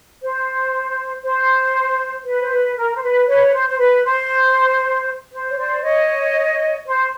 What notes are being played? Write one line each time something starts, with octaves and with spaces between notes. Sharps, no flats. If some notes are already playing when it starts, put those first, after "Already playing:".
C5
C5
B4
C5
B4
A#4
C5
B4
B4 C#5
B4
C5
C5
B4
C5
C5
C#5
C5 D5
C#5 D#5
C5